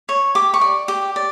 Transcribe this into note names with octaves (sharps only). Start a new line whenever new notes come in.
C#5
G4 D6
C#6
D5
G4
D5